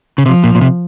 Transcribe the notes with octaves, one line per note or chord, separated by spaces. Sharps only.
C#3
C3 F3
A#2
A#2
C3